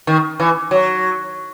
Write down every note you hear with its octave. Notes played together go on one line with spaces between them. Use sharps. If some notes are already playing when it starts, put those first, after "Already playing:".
D#3
E3
F#3